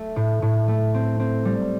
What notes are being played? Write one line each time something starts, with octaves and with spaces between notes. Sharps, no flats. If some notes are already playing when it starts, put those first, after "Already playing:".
Already playing: A3
A2
A2
A3
C4
C4
G3